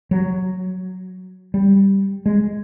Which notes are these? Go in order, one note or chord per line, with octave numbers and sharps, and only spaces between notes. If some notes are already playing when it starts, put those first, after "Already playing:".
F#3
G3
G#3